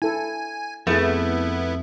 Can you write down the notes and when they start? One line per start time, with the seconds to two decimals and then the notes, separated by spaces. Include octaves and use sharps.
0.02 E4 A4 G#5
0.87 F2 A3 B3 E4 G#4 B4